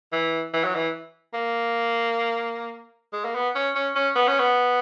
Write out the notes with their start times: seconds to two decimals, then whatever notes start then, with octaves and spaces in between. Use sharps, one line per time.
0.12 E3
0.53 E3
0.64 F#3
0.75 E3
1.34 A#3
3.13 G#3
3.25 A#3
3.35 B3
3.55 C#4
3.75 C#4
3.95 C#4
4.16 B3
4.28 C#4
4.39 B3